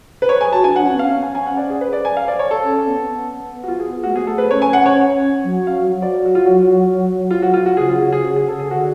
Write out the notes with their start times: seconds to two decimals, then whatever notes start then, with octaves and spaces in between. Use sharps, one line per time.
0.22 B4
0.29 C#5
0.41 G#4 G#5
0.52 F#4 A5
0.64 D4 G#5
0.76 D4 F#5
0.84 C#4
0.93 B3
0.99 C#4 F5
1.23 G#5
1.35 G#5
1.46 F#5
1.57 D5
1.70 G#4
1.81 B4
1.93 D5
2.05 G#5
2.17 F5
2.28 D5
2.39 C#5
2.51 A4
2.62 C#4
2.86 B3
3.10 B3
3.64 F#4
3.68 F4
3.79 G#4
4.03 A3 F#4
4.12 B3 G#4
4.21 A3
4.27 A4
4.38 B4
4.50 C#4 C#5
4.62 G#5
4.73 F#5
4.86 C#5
5.43 F#3
5.67 F5
5.90 F#3
6.02 D5
6.26 F#4
6.35 F4
6.46 F#4
7.31 F4
7.42 F#4
7.54 F4
7.66 F#4
7.77 C#3 G#4
7.89 F4
8.01 F#4
8.13 G#4
8.24 F#4
8.36 G#4
8.48 A4
8.60 G#4
8.71 D3 F#4